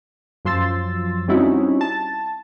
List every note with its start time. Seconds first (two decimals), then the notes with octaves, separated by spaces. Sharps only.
0.45 F#2 F3 C6 E6 A6
1.28 G3 C4 C#4 D#4 E4 F#4
1.81 A5